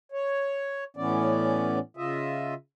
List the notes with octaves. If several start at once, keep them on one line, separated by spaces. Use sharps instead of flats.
C#5
A2 E3 B3 C#4 D5
C#3 F4 D#5 E5